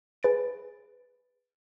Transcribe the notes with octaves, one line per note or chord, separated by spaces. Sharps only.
G#4 B4 A6 D7